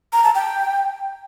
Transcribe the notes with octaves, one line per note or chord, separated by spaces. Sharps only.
A#5
A5
G5